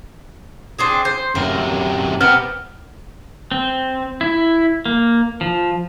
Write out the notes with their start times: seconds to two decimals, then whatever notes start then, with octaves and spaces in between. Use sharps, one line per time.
0.79 C4 D4 G#4
1.05 C5
1.35 F#2 C3 A#4
2.21 B3 C4 G4 A#4 F6
3.51 C4
4.21 E4
4.86 A#3
5.41 F3